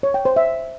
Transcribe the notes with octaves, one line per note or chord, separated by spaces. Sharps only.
C#5
G5
C5
E5